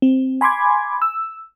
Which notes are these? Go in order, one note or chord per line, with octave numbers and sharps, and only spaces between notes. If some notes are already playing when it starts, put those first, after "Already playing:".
C4
G#5 B5 C6 D6 G#6
E6